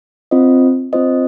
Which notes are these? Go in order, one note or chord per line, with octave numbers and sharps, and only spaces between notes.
C4 F4 C5 D#5
C4 F4 C5 D#5